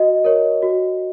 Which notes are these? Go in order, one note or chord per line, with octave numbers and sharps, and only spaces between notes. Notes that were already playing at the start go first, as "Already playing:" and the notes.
Already playing: F#4 D#5
A#4 C#5
F#4